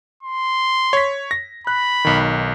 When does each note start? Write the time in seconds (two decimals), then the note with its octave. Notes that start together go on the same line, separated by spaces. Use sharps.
0.23 C6
0.93 C#5 B6
1.31 A#6
1.67 B5 F#6
2.05 B1 D#3